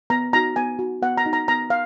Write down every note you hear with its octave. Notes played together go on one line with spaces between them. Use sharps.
B3 A#5
D#4 F#4 A#5
B3 G#5
D#4 F#4
B3 F#5
A#5
D#4 F#4
A#5
B3 A#5
F5